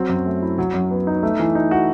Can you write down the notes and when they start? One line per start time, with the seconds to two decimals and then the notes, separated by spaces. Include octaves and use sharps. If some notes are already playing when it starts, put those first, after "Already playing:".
Already playing: F#3 C4
0.09 F#2
0.26 A3
0.42 E4
0.58 F#3
0.74 F#2
0.91 B3
1.07 D#4
1.23 A3
1.39 E3
1.55 D#4
1.71 F#4